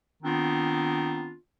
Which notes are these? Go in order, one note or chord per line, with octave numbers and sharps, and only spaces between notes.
D#3 B3 C4 D4 F4